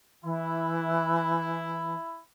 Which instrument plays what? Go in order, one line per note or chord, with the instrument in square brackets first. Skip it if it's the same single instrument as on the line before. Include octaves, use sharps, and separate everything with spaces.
[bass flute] E3 [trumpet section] E4